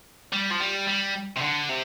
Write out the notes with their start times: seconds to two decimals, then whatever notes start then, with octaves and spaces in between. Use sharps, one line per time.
0.33 G3
0.51 F3
0.60 G3
0.87 G3
1.36 C3
1.41 D3
1.69 C3